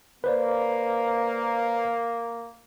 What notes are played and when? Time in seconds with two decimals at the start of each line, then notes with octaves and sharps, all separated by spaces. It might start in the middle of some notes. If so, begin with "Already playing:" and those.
0.24 A#3 B4 C5 D5